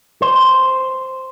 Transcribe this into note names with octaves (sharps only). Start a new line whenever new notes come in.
C5